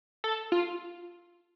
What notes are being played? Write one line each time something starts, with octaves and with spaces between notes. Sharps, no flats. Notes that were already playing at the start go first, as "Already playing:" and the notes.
A4
F4